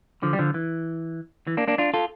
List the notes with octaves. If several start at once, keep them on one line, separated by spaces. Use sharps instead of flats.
D3 F3
G3
D3 F3
E3
E3
A#3 D4
A#3 D4
D4 F4
F4 A4